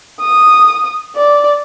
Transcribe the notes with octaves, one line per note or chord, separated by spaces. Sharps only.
D#6
D5